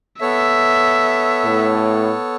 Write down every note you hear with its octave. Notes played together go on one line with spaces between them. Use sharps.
B3 A4 C#5 E5
A2